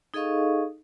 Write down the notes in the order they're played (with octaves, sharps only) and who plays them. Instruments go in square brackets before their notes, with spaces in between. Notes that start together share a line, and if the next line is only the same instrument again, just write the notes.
[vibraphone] D#4 G#4 A4 D#5 F5 C#6